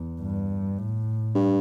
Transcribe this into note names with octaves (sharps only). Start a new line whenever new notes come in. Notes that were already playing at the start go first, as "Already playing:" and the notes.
Already playing: E2
G2
A2
G2